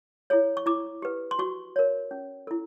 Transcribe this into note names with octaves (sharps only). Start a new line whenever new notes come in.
E4 G#4 C#5
C#6
E4 D6
G4 B4
C6
F#4 C#6
A#4 C#5
C#4
E4 A4